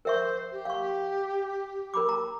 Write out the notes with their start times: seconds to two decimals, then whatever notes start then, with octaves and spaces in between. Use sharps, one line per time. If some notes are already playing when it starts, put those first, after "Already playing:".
0.05 A#4 C5 E5 C#6
0.52 G4
0.65 F5 C#6
1.94 A#4 B5 D6
2.09 A#5